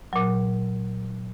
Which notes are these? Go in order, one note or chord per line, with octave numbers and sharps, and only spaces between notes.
A#2 F#3